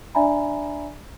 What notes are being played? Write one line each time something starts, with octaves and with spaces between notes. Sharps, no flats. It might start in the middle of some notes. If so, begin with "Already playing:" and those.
D4 D5 E5 G#5 A#5 B5